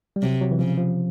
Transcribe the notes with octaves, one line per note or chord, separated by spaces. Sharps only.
G3
C3 F#3
F#3
E3
C#3 F3
F3